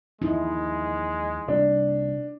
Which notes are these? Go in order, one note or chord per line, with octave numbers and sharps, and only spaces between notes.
D#2 F3 G#3 D#4 E4
C3 G3 A#3 D4